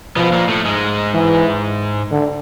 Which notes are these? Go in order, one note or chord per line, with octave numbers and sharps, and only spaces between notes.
B2 F3 B3
A#2 A#3
A2 A3
G#2 G#3
E3
D3